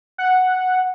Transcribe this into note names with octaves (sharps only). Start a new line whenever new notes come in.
F#5